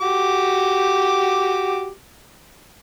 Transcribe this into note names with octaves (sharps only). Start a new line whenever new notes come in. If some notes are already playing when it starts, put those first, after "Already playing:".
F#4 G4 D6